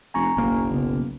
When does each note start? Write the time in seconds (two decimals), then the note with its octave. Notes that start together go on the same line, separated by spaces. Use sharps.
0.14 F1 G#5 A#5 C#6
0.37 F#1 B1 A#3
0.71 C#3 B3